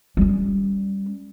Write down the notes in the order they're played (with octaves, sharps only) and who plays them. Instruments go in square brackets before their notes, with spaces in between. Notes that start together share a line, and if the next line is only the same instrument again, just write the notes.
[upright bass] G3 C#4